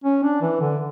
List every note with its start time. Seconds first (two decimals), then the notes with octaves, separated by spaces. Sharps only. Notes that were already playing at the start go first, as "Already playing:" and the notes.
0.04 C#4
0.23 D4
0.42 E3
0.61 D3